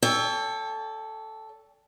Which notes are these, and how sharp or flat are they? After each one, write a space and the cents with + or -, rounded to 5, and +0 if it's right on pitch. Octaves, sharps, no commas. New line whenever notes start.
A4 +0 C#5 +40 G5 +35